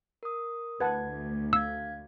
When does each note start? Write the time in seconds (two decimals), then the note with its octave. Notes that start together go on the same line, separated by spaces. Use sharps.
0.23 A#4 D#6
0.80 D2 B4 F#5 A5 G#6
1.53 F5 E6 G#6